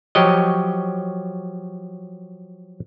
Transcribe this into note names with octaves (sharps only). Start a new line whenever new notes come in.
F3 F#3 G4 C#5 D#5